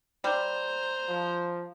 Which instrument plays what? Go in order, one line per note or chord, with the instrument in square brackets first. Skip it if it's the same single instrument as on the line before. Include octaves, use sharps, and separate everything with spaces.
[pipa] G3 [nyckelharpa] C5 A#5
[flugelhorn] F3